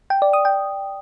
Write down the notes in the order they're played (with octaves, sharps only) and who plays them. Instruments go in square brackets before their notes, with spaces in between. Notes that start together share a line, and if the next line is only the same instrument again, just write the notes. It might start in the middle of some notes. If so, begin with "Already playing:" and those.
[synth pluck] G5
D5
D#6
G5